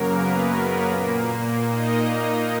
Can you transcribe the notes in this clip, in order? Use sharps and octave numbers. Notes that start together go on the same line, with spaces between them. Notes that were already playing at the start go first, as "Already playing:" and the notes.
Already playing: F#2 C#3 F#3 A#3 A#4
B3 B4
A#2 A#3
D#4 D#5
D#4 D#5